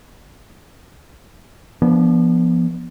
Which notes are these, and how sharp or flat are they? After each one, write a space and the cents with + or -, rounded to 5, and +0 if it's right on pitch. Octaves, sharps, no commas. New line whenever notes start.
F3 -25 B3 -25 D4 +0